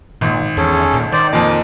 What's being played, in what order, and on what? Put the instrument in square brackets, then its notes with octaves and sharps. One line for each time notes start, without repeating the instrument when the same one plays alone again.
[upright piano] G#1 [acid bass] A#2
[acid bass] E2 [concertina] C#4 G#4 A4
[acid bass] A#2
[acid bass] D#3 [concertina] C5 D5
[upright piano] F2 A#2 [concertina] D6